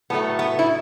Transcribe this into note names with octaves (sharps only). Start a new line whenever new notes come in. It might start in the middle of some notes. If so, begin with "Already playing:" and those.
A2 F#3 A3 B3
B3
E4